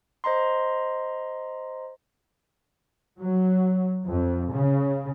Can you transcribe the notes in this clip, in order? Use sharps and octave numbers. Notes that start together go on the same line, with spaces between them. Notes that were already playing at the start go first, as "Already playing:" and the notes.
C5 D#5 A#5 C6
F#3
F2
C#3